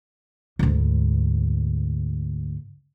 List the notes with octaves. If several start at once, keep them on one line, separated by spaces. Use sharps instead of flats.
D2 G#2